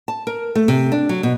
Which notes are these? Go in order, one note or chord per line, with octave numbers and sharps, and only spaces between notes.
A5
A#4
A3
C3
D4
F#3
B2